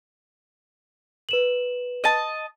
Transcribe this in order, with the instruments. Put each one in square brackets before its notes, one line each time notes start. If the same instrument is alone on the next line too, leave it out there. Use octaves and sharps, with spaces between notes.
[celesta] B4 E7 F#7
[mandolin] D#5 A5